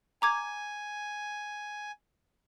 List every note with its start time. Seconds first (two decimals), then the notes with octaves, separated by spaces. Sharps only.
0.22 G#5 A#5 D6 G#6